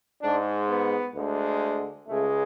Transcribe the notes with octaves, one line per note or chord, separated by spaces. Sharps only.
G#2 G#3 D4
B3
D2 D3 G#3
C#2 C#3 G#3 A3